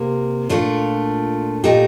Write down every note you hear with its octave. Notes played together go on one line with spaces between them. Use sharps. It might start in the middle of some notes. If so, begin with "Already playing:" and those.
Already playing: C3 A#3
A#2 A3 D4 F4
A#2 A3 D#4 G4